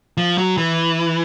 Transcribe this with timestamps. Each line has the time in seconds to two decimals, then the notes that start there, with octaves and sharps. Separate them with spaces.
0.17 F3
0.38 F#3
0.58 E3